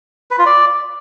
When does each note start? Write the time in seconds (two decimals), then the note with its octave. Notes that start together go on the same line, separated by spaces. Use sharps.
0.31 B4
0.38 F4
0.46 D5